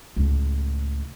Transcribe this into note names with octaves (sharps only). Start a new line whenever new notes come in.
C#2 A2